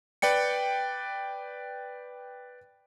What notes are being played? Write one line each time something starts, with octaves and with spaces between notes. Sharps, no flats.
B4 D5 G5 C#7